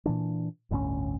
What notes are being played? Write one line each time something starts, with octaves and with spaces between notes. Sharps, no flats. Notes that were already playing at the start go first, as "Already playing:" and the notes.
A#2 E3 D4
G1 D2 A2 C#4